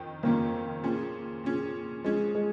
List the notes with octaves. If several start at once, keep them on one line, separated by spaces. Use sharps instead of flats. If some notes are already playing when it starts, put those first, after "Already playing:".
Already playing: F2 D#3
F2 D#3 A#3 C#4 F4
A#2 F3 C#4 G#4
A#2 F3 C#4 G#4
F3 G#3 C#4 G#4
G#3